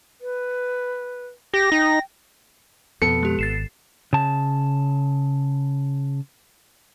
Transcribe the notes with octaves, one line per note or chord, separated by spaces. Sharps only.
B4
G4 A#6
D#4 G5
F2 B2 B3 A4 C#7
G#3 G4
G#1 A6 C7 E7
C#3 A5